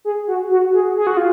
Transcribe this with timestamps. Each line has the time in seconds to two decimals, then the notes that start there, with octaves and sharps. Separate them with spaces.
0.05 G#4
0.28 F#4
0.51 F#4
0.73 G#4
0.97 G#4
1.07 F#4
1.17 F4